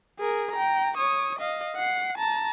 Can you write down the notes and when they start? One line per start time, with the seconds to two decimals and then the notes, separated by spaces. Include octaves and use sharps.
0.19 G#4 A#4
0.52 G5 A#5
0.97 C#5 D#6
1.39 D#5 F5
1.76 F#5 C7
2.18 A5 A#5